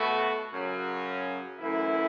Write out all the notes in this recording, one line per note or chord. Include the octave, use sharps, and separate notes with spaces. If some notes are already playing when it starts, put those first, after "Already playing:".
Already playing: B2 A3 F#4
F#2 C#3 F#3 C#4
F#2 E3 A3 E4